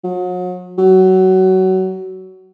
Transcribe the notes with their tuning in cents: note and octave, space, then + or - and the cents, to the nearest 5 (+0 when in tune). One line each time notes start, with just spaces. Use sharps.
F#3 -40
F#3 +20